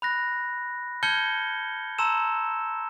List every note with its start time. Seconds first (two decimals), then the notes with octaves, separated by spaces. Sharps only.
0.02 B5 F#6 A#6
1.03 A5 F6 G6 G#6 C#7 G7
1.99 A5 A#5 C6 E6 E7